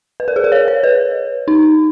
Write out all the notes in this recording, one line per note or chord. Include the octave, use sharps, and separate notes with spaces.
B4
A#4
G#4
A#4
C#5
C#5
B4
D#4